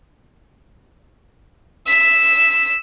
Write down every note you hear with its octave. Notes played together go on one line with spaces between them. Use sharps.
E6 B6